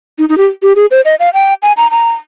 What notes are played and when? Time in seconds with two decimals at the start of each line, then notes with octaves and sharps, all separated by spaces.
0.18 D#4
0.29 D#4
0.38 G4
0.63 G4
0.76 G#4
0.91 C5
1.05 D#5
1.20 F5
1.34 G5
1.62 G#5
1.77 A#5
1.91 A#5